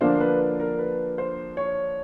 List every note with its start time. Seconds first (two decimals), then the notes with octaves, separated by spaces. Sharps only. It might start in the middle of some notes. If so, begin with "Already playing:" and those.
0.01 D3 F3 A#3 D4 C5
0.20 B4
0.60 A#4
0.79 B4
1.18 C5
1.57 C#5